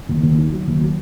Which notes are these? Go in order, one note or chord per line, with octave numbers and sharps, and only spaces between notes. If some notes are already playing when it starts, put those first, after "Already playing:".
D#2
D#2
D#3
F#3
D#2
F#3